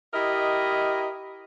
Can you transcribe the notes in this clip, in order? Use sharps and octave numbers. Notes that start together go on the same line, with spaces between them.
E4 G4 A#4 D#5